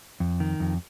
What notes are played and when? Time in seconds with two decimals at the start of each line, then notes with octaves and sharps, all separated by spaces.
0.20 F2
0.40 D#3
0.60 F2